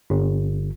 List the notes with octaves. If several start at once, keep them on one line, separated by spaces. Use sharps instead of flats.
G1